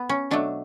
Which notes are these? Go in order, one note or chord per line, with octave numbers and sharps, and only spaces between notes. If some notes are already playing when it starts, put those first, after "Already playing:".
Already playing: B3
C#4
B2 F#3 A3 D4